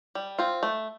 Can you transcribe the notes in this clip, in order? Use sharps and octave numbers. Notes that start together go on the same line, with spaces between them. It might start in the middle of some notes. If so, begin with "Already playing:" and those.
G3
C4 F4
A3